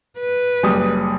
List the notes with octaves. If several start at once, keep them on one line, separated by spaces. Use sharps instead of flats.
B4
F#1 G3 D#6